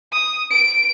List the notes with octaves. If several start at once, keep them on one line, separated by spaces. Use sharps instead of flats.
D#6
D7